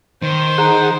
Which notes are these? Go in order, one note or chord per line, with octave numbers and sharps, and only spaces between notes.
D#3 C5
D#4 G#4 F#5 A#5